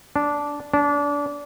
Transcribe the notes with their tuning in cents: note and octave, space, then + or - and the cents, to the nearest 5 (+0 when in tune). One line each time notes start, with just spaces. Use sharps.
D4 -10
D4 -25